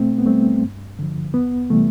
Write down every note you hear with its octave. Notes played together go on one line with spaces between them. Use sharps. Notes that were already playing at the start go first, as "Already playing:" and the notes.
Already playing: B2 A3 C4
B3
G3 A3 C4
G2
D3 F3
E2 B3
C3 E3 G3 A3